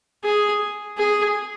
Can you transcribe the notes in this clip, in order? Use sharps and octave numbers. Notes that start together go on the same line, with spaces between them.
G#4
G#4